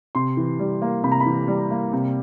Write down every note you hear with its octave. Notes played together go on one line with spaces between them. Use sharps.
C3 C6
E3
G3
A#3
C3 B5
A#5
B5
E3
G3
A#3
C3